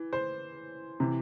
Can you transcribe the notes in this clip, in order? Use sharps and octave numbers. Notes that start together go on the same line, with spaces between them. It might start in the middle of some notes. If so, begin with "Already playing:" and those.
Already playing: E3
C5
C3 E3